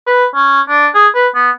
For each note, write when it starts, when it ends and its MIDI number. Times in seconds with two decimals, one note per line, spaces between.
0.07 0.25 71
0.35 0.61 61
0.69 0.88 62
0.95 1.08 68
1.15 1.28 71
1.35 1.51 59